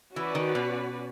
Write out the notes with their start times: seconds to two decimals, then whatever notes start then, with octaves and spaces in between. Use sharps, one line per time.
0.16 E3 C#4 F#4 B4 D5
0.35 D#3
0.55 B2